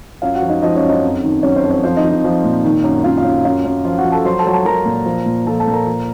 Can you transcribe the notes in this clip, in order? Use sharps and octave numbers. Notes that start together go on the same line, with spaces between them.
F#2 F4 F5
F#4 F#5
F3
D#4 D#5
F3 D#4 D#5
C#4 C#5
F#2
D#4 D#5
F2
D#3
F#3 C#4 C#5
C5
F2
C5
F3 C5
D#4 D#5
F3
D#4 D#5
F3
A#2
D#3
F#2
F#2 F4 F5
F4 F5
F#2
F#2 F4 F5
F#2
F3 F4 F5
F#4 F#5
F3
A4 A5
F#3 C5 C6
A4 A5
F#3
A4 A5
F#3 A#4 A#5
A#2
F3
A#2
F3 A4 A5
A4 A5
A#2
A#4 A#5
F3